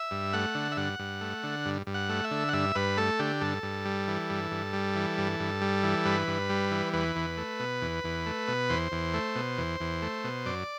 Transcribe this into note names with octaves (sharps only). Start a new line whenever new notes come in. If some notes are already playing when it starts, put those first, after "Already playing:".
Already playing: E5
G2
A3 F#5
D3
E5
G2 F#5
G2
A3
D3
G2
G2
F#5
A3
E5
D3
F#5
G2 E5
G2 B4
A3 A4
D3 G4
G2 A4
G2
G3
E3
G2
G2
G3
E3
G2
G2
G3
E3
G2 B4
G2
G3
E3
E2 B4
E2
A3
B2
E2
E2
A3
B2
E2 C5
E2
A3
B2
E2
E2
A3
B2
F#2 D5